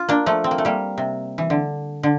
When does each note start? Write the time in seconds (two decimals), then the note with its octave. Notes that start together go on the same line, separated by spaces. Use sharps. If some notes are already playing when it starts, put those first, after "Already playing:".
Already playing: F4
0.09 A#3 D4
0.26 F3 A3
0.44 C4
0.51 A#3
0.58 A3
0.65 G3 A#3
0.98 C3
1.38 E3
1.50 D3
2.03 D3